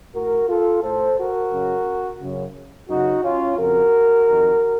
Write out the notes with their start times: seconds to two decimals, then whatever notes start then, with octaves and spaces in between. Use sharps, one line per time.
0.15 A2 F#4 A#4
0.49 F4 A4
0.83 A2 A4 C5
1.18 F#4 A#4
1.53 F#2 C#3
2.21 F#2 C#3
2.90 F#2 C#3 D#4 F#4
3.24 C#4 F4
3.58 F2 C#3 F#4 A#4
4.27 F2 D#3